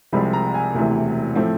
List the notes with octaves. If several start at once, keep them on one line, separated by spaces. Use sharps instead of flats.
C2 C3 F3 G#3 B5
A#5
G#5
E1 D2 C3 E3
A2 F3 A3 C4